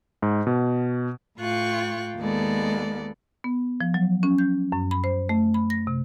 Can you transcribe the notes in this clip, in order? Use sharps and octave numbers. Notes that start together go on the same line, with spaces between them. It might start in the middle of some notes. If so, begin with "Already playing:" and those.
G#2
B2
A2 F4 G5 C#6 F#6
D#2 G#3 B3 A4 D5
B3
F3
F#3
C#4
G6
F#2
B5
C5
A3
B5
A#6
C3